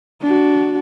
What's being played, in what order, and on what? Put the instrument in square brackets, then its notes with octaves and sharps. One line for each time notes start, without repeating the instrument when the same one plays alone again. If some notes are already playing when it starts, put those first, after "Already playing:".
[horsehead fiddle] D4 F#4